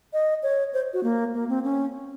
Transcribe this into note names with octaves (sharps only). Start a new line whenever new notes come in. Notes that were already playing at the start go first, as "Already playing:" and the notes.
D#5
C#5
C5
F#4
A#3
A#3
C4
C#4